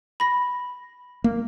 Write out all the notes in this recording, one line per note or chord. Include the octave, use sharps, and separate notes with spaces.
B5 A#6
A#3